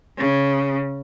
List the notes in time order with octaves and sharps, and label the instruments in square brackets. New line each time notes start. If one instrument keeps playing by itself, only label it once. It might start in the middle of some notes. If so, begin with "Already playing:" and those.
[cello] C#3